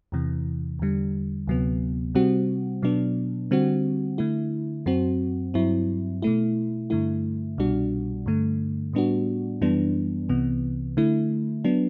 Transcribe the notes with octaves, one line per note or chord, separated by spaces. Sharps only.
E2 C3 E3
E2 D3 G3
D2 C3 F#3 B3
C3 G3 C4 F#4
B2 F#3 B3 D4
D3 G3 C4 F#4
D3 A3 E4
F#2 F#3 C4 F#4
G2 F#3 C4 E4
B2 A3 E4
G2 D3 A3 E4
C2 B2 G3 D4 F#4
G2 D3 A3
A2 G3 B3 D4 F#4
F#2 E3 G3 B3 D4
C2 C3 E3 B3
D3 A3 E4
F#3 B3 D4